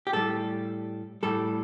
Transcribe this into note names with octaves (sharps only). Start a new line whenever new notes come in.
G4
A2 G3 A4
A2 G3 A4